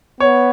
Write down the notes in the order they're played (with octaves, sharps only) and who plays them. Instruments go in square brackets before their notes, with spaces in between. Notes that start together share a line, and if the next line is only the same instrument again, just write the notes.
[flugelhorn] B3 [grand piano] C#5